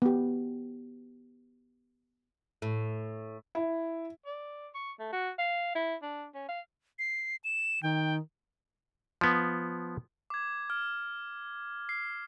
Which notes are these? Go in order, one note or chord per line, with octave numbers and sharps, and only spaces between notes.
B3 G4
A2
E4
D5
C#6
A3
F#4
F5
E4
D4
C#4
F5
C7
E7
D#3 G5
F3 B3
D6 G#6
F6
C7